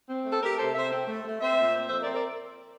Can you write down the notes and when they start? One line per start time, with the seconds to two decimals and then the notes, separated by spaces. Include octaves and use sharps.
0.09 C4
0.25 A3
0.30 A4
0.42 A3 G4 A#4
0.58 C3 A4 C5
0.74 C3 C5 E5
0.92 C4
1.07 A3
1.25 A3
1.40 C4 C5 E5
1.57 A#2
1.74 C4
1.89 F2 C5 E5
2.02 A#4 D5
2.06 C4
2.15 A#4 D5